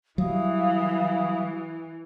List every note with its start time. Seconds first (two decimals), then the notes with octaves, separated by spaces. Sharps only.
0.18 E3 F#3 G3 E5 F5 D#6